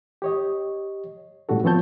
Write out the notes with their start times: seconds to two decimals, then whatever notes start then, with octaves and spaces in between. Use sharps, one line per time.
0.22 G4 C#5 D#5
1.49 A2 G3 C#4 F#4 A4
1.64 F3 B3 C4 C#5 A5 G6